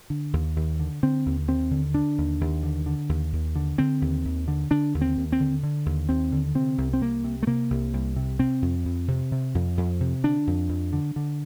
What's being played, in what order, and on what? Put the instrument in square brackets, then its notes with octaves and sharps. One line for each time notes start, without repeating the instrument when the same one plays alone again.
[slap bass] D3
D#2
D#2
D3
D3 C4
D#2
D#2 C4
D3
D3 D4
D#2
D#2
D3
D3
D#2
D#2
D3
D3 C4
D#2
D#2
D3
D3 D4
D#2
C4
D#2
C4
D3
D3
D#2
D#2 C4
D3
C3 C4
C2
C4
C2 A#3
C3
A3
C3 A#3
C2
C2
C3
C3 C4
F2
F2
C3
C3
F2
F2
C3
D3 D4
F2
F2
D3
D3